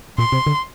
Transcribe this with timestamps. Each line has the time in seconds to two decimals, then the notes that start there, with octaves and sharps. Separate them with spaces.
0.18 A#2 C6
0.32 C3
0.46 D3